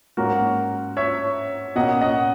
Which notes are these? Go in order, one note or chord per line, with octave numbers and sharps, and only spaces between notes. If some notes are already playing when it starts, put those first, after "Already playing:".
G#2 F#3 A#3 C#4 F#4 A#4
C#5 E5
B2 A#3 C#4 D#5 F#5
D#5 F#5